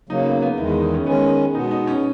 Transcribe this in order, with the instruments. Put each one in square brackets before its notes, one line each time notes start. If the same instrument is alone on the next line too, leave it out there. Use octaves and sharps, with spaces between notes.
[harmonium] C#3 F#3 A#3 [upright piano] D#4
[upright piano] B3
B3
[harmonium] E2 D#3 G#3 [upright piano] E4
[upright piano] E4
D#4
C#4
[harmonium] D#3 G#3 C#4 [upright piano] B3
[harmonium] B2 G#3 B3 [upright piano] D#4
[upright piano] D#4
C#4